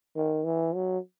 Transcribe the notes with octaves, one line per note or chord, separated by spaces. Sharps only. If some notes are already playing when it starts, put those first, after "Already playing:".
D#3
E3
F#3